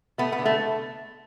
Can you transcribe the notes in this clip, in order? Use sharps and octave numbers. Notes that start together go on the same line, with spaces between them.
A3 B3
B3
D3
A3